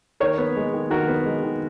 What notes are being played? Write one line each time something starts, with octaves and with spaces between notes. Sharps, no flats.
D#3 A#4 C#5
B3
G#3
D#3
D#3 F#4 A#4
B3
G#3
D#3